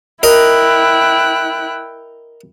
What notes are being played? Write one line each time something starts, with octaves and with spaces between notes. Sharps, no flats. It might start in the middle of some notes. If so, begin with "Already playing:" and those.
E4 A#4 D#5 G5 F#6